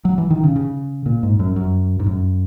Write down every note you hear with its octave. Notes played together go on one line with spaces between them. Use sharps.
F#3
E3
D#3
C#3
C#3
A#2
G#2
F#2
F#2
G#2
F#2